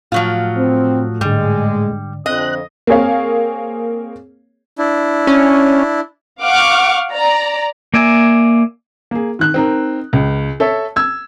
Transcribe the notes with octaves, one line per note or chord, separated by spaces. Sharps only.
A2 F3 F#3 F4
C4
G#2 D3 G3 G#3
F2 D3 C4 D#5 F#6
A#3 C4 G#4 C#5 F5
D4 E4
C#4
F5 F#5 C#6 D6 F6
D5 A#5
A#3 D5 E5 G#5
A#3 G#4
D#3 F#6
C4 D#4 A#4
C#2
A4 C#5 E5
E6 G#6